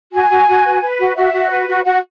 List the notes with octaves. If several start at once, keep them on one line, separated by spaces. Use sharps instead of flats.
F#4 G#5
F#4
F#4
B4
B4
F#4
F#4 E5
F#4
B4
F#4
F#4 F#5